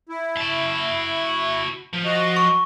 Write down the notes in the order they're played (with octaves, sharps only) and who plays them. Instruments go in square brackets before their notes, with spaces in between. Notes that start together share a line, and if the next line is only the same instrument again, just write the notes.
[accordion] E4
[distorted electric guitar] F#4 A5
F3
[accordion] F#4 D#5
[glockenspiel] C#6